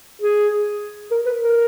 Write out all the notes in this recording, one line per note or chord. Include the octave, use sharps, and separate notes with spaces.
G#4
A#4
B4
A#4